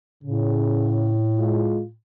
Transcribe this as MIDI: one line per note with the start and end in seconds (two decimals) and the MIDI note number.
0.24 1.94 45
0.24 1.15 49
1.39 1.81 56
1.39 1.81 65